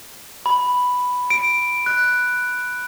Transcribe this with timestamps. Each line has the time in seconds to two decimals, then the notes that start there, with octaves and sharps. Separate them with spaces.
0.46 B5
1.30 D7
1.86 F#6